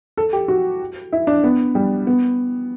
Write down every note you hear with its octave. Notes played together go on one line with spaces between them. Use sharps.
A4
G4
F#4
E4
D4
B3
G3
B3